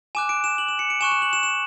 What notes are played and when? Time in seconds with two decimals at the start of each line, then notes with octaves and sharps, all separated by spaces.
0.15 G#5 D6 F#6 E7
0.29 D7
0.44 E7
0.58 F#7
0.68 E7
0.79 C#7
0.90 D7
1.01 G#5 C#6 F#6 E7
1.12 E7
1.22 F#7
1.33 E7
1.43 E7